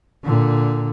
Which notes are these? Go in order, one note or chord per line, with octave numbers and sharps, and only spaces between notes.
A#2 D3